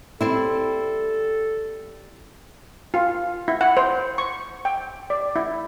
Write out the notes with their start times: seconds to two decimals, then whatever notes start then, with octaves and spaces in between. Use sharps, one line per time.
0.21 G3 C4 E4 A4
2.94 F4
3.48 E4
3.61 F#5
3.77 C5
4.18 C#6
4.65 G5
5.10 D5
5.36 E4